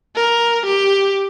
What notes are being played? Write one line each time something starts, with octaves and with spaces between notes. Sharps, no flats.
A#4
G4